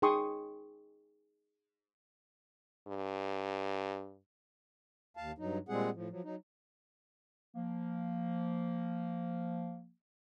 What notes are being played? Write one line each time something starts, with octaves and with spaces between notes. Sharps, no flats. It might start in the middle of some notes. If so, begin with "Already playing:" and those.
D#4 G#4 G5 C6 C#6 D#6
G2
D#2 F5 A5
G2 F#3 D#4
A#2 G3 G#3 C4 G#4 F#5
A2 F3
F3 F#3
F#3 D#4
F3 A#3